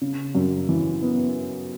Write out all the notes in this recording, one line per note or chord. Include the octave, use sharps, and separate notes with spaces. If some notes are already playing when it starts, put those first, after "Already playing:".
C#3
F#2
E3
B3